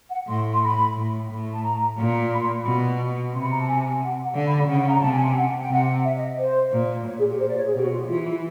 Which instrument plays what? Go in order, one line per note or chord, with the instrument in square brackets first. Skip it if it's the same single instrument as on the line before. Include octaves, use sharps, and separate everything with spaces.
[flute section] F#5
[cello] A2 [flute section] C6
[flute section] C6
B5
[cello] A2
A2
[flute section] A5
A#5
[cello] A#2
[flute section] B5
C6
B5
[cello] B2
[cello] C3 [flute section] C6
[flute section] B5
A#5
A5
G#5
F#5
F#5
[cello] D3 [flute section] F5
[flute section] B5
B5
[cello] C#3 [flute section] F#5
[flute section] A#5
[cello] C3 [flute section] A5
[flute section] G#5
G5
F#5
G5
[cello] C3 [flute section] F#5
[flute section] E5
D#5
C5
[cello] A#2
[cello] A#2 [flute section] C#5
[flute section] G#4
G4
C5
D5
C#5
G#4
[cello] B2 [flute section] G4
[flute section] F#4
F4
G4
[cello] E3 [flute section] F4
[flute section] E4